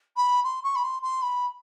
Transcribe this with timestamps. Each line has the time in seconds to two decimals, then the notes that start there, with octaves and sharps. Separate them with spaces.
0.17 B5
0.44 C6
0.64 C#6
0.76 B5
0.84 C6
1.02 C6
1.22 B5